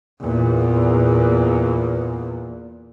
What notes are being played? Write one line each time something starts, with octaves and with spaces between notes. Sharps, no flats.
E2 A#2